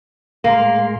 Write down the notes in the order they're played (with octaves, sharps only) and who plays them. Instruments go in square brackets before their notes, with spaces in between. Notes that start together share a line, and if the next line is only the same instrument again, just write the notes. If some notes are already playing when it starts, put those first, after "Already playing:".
[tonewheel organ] A2 G#3 C6 [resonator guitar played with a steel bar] A#3